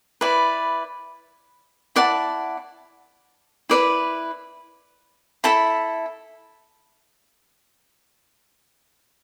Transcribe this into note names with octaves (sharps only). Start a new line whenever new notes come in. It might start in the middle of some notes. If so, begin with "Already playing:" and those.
E4 B4 D5
E4 D5 F#5 A5
E4 B4 D5 B5
E4 A4 E5 B5